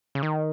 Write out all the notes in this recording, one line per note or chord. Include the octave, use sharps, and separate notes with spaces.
C#3
D#3